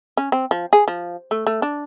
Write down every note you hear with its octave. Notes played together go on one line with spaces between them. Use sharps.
C#4
C4
F3
G#4
F3
A3
A3
D4